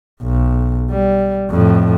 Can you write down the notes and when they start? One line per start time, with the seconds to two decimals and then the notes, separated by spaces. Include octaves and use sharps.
0.22 B1
0.91 G3
1.51 F2 A2